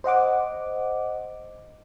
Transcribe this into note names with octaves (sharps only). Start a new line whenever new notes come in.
C5 D#5 F#5 D6